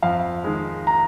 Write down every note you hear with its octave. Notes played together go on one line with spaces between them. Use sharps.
F2 F5
D#3 G#3
A#5